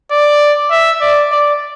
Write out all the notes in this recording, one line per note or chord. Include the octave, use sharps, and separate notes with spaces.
D5
E5
D5
D5